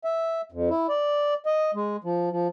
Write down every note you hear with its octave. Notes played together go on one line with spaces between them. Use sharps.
E5
F2
E4
D5
D#5
G#3
F3
F3